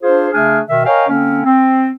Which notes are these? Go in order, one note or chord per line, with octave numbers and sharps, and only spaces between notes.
D4 F4 G#4 C5
C#3 A3 D4 G#4 G#5 F6
B2 D#3 E5
A#4 C#5 D#5 F5 G5 G#5
D3 A#3 C4 C#4
C4